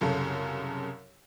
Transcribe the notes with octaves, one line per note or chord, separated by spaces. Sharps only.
C2 F#2 C#3 A4